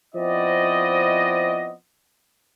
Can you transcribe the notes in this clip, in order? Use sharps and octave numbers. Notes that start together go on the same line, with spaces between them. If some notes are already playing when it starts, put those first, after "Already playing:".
F3 B3 C4 E4 D5 D#5